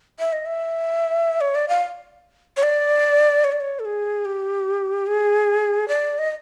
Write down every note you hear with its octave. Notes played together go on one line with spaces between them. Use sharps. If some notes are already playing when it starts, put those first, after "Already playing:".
E5
D#5
E5
C#5
D5
F5
C#5
D5
C#5
D5
C#5
A4
G#4
G4
G#4
D5
D#5